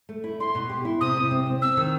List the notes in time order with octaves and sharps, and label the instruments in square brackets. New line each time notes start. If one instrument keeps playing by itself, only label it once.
[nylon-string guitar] A3
E4
[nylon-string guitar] E4 [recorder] C6
[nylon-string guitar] B2
G4
E4
[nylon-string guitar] C3 [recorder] D#6
[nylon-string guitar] C3
C4
C4
[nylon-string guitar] C4 [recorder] E6
[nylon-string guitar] D#3